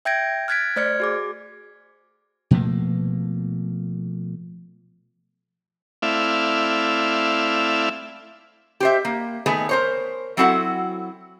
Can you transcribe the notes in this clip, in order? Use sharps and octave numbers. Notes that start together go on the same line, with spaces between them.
E5 G5 G6 G#6 A#6 D7
F6 F#6 G#6 A6 B6 D7
A3 C5 D5 F6 G#6 C#7
F#4 G#4 D6
B2 F3 A3 A#3
A3 C4 E4 D5 E5 F5
G4 C5 E5
A#3
D#3 A3 B3 G#4
A#4 C5 C#5
F#3 C4 E4 F#4 A4 F#5